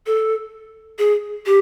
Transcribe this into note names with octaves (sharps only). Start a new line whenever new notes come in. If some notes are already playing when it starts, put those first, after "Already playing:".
A4
G#4
G4